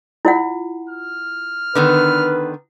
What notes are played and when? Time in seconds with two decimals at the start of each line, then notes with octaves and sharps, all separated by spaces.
0.25 E4 F4 F#5
0.89 F6
1.75 D3 D#3 B3 B4